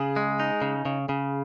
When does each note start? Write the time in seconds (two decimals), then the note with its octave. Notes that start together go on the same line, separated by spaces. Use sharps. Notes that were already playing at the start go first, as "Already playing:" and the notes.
Already playing: C#3 G#4
0.16 G#3
0.40 D#4
0.62 C#3
0.85 C#3
1.09 C#3